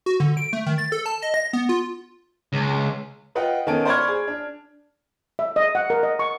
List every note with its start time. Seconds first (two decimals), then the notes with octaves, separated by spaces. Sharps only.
0.06 F#4
0.20 D3
0.37 D7
0.53 A3
0.66 D#3
0.78 A6
0.92 A4
1.06 A5
1.23 D#5
1.34 A#6
1.53 B3
1.69 F4
2.53 C#2
3.35 F4 B4 D#5 F#5 G5
3.67 D#3 B3 C#4 A4 G#5 D7
3.85 C5 D5 B5 C#6 F6 G#6
4.08 G#4
4.27 D4
5.39 E5
5.56 D#5
5.75 F#5
5.90 A#4
6.03 D#5
6.19 C#6